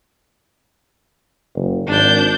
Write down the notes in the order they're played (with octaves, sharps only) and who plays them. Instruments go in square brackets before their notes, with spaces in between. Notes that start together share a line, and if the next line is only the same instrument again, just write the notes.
[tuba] F#1
[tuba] G#1 [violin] D4 G6